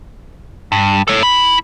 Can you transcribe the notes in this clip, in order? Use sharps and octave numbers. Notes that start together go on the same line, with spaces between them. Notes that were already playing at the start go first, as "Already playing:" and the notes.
G2
A4 C#5
E4 B5